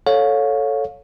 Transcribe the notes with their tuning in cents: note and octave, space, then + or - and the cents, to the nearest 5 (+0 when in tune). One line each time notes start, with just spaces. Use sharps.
A4 +0 C#5 +0 F5 +25